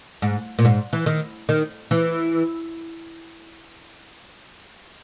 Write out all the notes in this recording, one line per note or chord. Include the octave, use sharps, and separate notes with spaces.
G#2
A#2
G#2
E3
D#3
D#3
E3